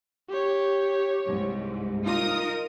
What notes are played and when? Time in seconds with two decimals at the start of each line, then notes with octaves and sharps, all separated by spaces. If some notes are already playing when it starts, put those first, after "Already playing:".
0.29 G4 C#5
1.26 C2 G#2
2.05 D#4 F4 A#4 D#6